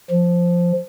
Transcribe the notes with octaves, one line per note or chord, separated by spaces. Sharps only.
F3